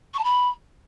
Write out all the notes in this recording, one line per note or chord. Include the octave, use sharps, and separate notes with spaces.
C#6
A5
B5